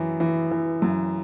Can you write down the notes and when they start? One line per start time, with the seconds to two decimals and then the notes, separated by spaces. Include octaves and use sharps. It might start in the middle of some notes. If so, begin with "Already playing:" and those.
Already playing: F#2 E3
0.20 E3
0.51 E3
0.82 F#2